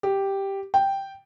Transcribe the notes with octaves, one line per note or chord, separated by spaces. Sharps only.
G4
G5